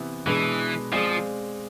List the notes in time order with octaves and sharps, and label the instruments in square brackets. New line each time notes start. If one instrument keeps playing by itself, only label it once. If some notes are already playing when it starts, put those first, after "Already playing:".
Already playing: [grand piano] C3 E3 B3 E4
[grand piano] B2 G#3 D4 G#4 B4 [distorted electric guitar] E3
[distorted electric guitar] F3 [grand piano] G#3 C4 G#4 D5 F5